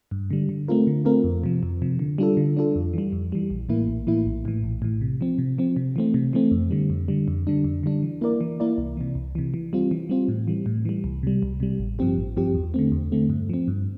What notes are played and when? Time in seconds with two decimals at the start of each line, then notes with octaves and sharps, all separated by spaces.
0.11 G2
0.30 D3 G3
0.49 D3
0.68 A3 C4 F4 A#4
0.87 D3
1.05 A3 C4 F4 A#4
1.24 F2
1.44 C3 F3
1.63 F2
1.82 C3 F3
1.99 D3
2.18 G3 D4 F4 A4
2.37 D3
2.57 G3 D4 F4 A4
2.76 F2
2.93 E3 G3
3.12 F2
3.32 E3 G3
3.50 A#1
3.69 A2 E3 A#3 E4
3.88 A#1
4.07 A2 E3 A#3 E4
4.26 A#1
4.45 A2 E3
4.64 A#1
4.82 A2 E3
5.01 C3
5.21 F3 C4
5.38 C3
5.58 F3 C4
5.76 C3
5.96 E3 A3 C4
6.14 C3
6.33 E3 A3 C4
6.51 F2
6.71 D3 G3
6.90 F2
7.08 D3 G3
7.28 F2
7.47 D3 G3 D4
7.64 F2
7.83 D3 G3 D4
8.03 E3
8.21 A#3 E4 A#4 D5
8.41 E3
8.60 A#3 E4 A#4 D5
8.78 C2
8.97 C3 E3
9.15 C2
9.35 C3 E3
9.54 E3
9.73 G3 C4 F4
9.91 E3
10.09 G3 C4 F4
10.28 A2
10.48 E3 G3
10.66 A2
10.85 E3 G3
11.04 C2
11.23 C3 G3
11.43 C2
11.60 C3 G3
11.79 A1
11.99 G2 F3 C4 G4
12.18 A1
12.37 G2 F3 C4 G4
12.54 E2
12.74 D3 A3 C4
12.92 E2
13.12 D3 A3 C4
13.30 G2
13.49 F3 C4
13.68 G2